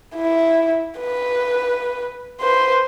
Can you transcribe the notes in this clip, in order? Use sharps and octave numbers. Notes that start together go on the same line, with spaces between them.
E4
B4
B4 C5